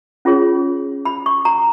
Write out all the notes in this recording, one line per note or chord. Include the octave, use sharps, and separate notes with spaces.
C#4 F4 G#4 C#5
B5
C#6
A#5